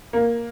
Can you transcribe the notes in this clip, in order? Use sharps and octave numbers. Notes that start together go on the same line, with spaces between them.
A#3